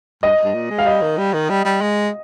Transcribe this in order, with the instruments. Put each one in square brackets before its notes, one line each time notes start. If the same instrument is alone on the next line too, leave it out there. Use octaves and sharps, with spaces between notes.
[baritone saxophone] G2 [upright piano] D#5
[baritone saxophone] G2
A#2
G#3
[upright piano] F5
[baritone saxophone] G3 [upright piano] D#5
[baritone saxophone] D#3
G3
D#3
G3
G3
G#3